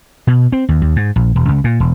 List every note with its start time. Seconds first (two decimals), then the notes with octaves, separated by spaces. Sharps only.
0.27 B2
0.52 C4
0.69 D#2
0.82 D#2
0.96 G#2
1.16 A#1
1.36 E1
1.49 C#2
1.64 A#2
1.80 E1